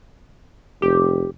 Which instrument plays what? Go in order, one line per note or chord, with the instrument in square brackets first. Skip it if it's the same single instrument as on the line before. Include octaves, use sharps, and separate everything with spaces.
[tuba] F1 [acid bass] G4